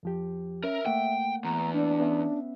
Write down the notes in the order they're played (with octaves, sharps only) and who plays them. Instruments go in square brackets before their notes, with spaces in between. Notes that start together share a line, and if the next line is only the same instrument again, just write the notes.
[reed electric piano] F2 F3 G4
[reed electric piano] C#4 [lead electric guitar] A#4 [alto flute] E5
[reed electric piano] A3 A#3 F#5 [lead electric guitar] G5
[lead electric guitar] E2 [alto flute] A#5
[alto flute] D4
[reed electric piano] B3 C#4 E5